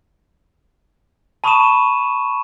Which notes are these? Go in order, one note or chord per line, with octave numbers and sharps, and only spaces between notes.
A5 B5 C#6 D#6 D#7 E7